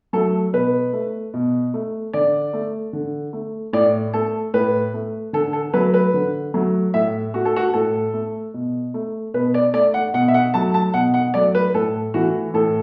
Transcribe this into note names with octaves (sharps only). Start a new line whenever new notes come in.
F#3 A3 A4
B2 B4
A3
B2
A3
D3 D5
A3
D3
A3
A2 D5
A3 A4
A2 B4
A3
D3 A4
A4
F#3 A3 B4
B4
D3
F#3 A3
A2 E5
A3 F#4
A4
F#4
A2 A4
A3
B2
A3
B2 B4
D5
A3 D5
F#5
B2 F#5
E5
F#5
F#3 A3 A5
A5
B2 F#5
F#5
F#3 A3 D5
B4
A2 A4
E3 A3 F#4
A2 A4